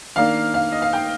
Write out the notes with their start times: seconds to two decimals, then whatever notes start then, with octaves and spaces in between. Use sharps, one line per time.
0.16 D#3 A#3 D4 F5
0.54 F5
0.72 D#5
0.82 F5
0.93 G5